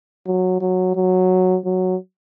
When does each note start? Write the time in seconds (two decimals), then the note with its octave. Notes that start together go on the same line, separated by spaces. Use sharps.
0.26 F#3
0.61 F#3
0.95 F#3
1.65 F#3